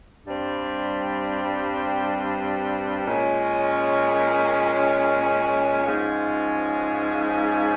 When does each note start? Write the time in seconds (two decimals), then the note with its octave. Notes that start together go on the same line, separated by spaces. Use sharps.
0.25 G2 G3 C4
3.05 A#2 G#3 C#4
5.84 G#2 F3 G#3 C#4